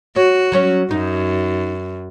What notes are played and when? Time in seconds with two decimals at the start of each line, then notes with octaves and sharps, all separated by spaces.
0.16 F#4 C#5
0.52 F#3 C#4 C#5
0.91 F#2 D#4